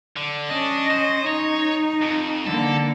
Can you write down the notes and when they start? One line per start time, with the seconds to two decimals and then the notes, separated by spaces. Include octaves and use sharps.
0.17 D3
0.49 C#4 D4 D#5
0.90 C5
1.27 D#4 C#5
2.02 F2
2.46 D3 A#3 A4